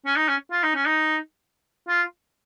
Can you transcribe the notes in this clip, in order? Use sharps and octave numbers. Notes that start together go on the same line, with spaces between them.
C#4
D#4
C#4
F4
D#4
C#4
D#4
F4